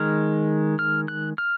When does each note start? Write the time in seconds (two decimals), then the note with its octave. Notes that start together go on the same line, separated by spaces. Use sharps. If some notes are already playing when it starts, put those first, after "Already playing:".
Already playing: D#3 G#3 F6
0.79 F6
1.08 F#6
1.38 F6